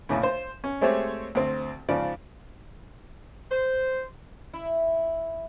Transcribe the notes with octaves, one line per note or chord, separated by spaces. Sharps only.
A#1 A2 C#3
C5
C#4
G#3 A3 C4 G4 C5 C#5
D2 C4
G#2 C#3 F3 D5
C5
E4